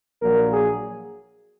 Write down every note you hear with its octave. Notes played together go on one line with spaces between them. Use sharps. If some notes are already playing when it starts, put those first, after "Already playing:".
A#1 A#2 F#3 A#4
G#4